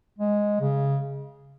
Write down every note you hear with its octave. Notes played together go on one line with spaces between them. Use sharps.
G#3
C#3